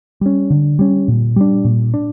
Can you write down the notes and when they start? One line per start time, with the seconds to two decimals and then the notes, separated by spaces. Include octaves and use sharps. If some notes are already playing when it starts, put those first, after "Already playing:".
0.21 G3 C#4
0.50 D3
0.79 G3 C#4
1.08 A#2
1.36 G3 D4
1.65 A#2
1.94 D4